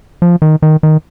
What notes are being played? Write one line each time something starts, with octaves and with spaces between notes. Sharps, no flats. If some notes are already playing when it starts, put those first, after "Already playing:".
F3
D#3
D#3
D#3